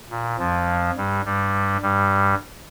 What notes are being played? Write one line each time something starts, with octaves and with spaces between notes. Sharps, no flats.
A#2
F2 F3
G2 G3
G2 G3
G2 G3